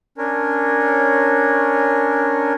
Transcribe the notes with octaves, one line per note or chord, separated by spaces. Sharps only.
C#4 D4 A#4 C#5